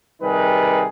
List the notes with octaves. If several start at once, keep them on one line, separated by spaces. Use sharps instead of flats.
C3 D#3 G3 D#4 G#4 B4